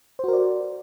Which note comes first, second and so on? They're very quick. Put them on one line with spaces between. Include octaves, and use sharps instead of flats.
C5 F#4 A#4 D5